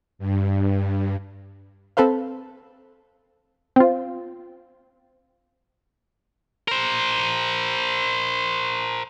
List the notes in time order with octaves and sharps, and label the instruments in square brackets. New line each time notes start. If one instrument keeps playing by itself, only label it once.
[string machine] G2
[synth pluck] C4 A4 B4 C5 F5
[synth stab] C4 F4
[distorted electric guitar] A#4 C5